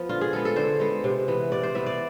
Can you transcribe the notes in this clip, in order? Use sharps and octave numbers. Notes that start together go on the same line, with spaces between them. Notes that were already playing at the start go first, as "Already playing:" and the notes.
Already playing: F3 B3
D3 F4
G#4
G#3 B3 A4
A4
D3 C5
G#3 B3
C3
E3 B3
C3 D5
C5
E3 B3 E5
D5